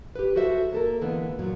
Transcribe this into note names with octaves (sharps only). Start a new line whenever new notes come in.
G4 B4
F#4 A4 C5 E5
A#3 A4 A#4
D3 E3 G#3 A#3 B3
A#2 F3 F#3